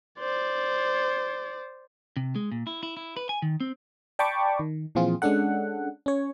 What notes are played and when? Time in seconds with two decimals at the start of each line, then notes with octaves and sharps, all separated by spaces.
0.19 C5 D5
2.17 C3
2.36 G#3
2.51 A#2
2.67 E4
2.83 E4
2.97 E4
3.17 B4
3.29 G#5
3.42 D#3
3.60 C4
4.19 D5 G5 A5 B5 C#6 D6
4.59 D#3
4.95 A#2 E3 F3 C4 F4 G#4
5.22 G#3 C#4 D4 A4 F#5
6.06 C#4 C#5